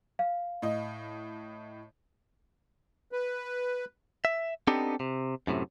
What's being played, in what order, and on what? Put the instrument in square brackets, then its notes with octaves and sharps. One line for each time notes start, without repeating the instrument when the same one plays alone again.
[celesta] F5
[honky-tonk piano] A2 D#5
[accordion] B4
[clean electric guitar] E5
B3 C4 D4 D#4 G4 A4
C3
F#2 A2 C3